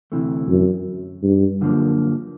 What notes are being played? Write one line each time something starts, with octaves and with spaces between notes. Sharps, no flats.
D2 C3 E3 A3
F#2
G2
F#2 D3 F3 A#3